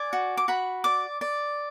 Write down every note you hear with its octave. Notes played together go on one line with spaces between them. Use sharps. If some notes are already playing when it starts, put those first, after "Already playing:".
Already playing: D5 G#5
F#4
D6
F#4 B5
D5 D6
D5